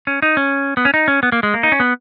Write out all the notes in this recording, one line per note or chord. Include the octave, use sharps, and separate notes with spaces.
C#4
D#4
C#4
B3
C#4
D#4
C#4
B3
A#3
G#3
A#3
D#4
C#4
B3